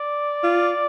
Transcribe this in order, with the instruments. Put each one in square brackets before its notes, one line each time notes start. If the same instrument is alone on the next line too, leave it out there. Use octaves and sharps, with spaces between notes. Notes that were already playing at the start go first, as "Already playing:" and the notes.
Already playing: [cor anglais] D5
[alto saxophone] F4